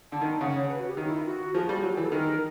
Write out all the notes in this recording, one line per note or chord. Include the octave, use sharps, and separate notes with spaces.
D3 A5
D#3
C#3 F#5
C#5
B4
F#4
G4
D#3 D#4
E4
F4
F#4
F3 G#4
F#4
G3
F#3
G#4
E3
A4
D#3 A#4